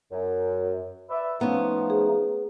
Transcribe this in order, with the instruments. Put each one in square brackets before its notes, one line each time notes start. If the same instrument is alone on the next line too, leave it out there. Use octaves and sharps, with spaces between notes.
[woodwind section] F#2
B4 D5 E5
[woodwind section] F3 [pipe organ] A3 D#4 [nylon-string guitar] B3 C#4
[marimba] G#4